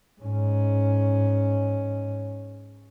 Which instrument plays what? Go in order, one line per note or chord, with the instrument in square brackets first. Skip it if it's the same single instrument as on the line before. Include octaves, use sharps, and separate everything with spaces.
[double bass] G#2 C#4